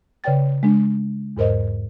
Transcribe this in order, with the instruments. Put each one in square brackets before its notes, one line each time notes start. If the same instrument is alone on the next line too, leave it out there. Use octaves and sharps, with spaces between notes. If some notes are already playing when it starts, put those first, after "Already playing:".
[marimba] C#3 B4 C#5 D5 G5 A6
G#3 D4
E2 G#2 A#4 C5 D#5